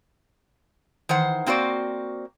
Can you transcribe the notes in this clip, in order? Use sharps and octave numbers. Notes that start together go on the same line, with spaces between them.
D#3 E3 C5 F#5
A#3 C4 F#4 C5 D5